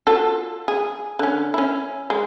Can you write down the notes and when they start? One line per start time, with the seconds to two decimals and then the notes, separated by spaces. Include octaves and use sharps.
0.07 F4 F#4 A4
0.68 G#4
1.19 D3 C#4
1.54 C#4 E4
2.10 G#3